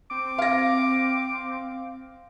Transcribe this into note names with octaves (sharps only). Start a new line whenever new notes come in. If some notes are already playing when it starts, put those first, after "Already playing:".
C4 D6
F5 A#6